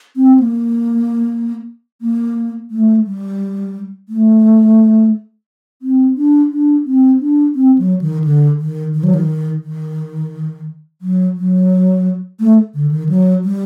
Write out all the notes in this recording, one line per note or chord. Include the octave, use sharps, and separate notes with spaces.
C4
A#3
A#3
A3
G3
A3
C4
D4
D4
C4
D4
C4
F#3
D#3
D3
D#3
D#3
F#3
D#3
D#3
F#3
F#3
A3
D3
D#3
F#3
G3